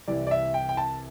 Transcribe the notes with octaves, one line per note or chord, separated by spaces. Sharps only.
C2 C3 E3 D5
D5
E5
G5
G5
A5